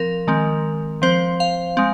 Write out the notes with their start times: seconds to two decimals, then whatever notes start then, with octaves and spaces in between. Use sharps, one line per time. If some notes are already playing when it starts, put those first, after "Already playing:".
Already playing: F3 C4 A#4
0.27 D#3 G#3 C4
1.02 F3 C4 C5
1.40 F5
1.77 G#3 C4